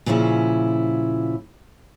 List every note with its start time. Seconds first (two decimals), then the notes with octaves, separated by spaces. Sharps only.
0.06 A#2 C#3 F3 C#4 E4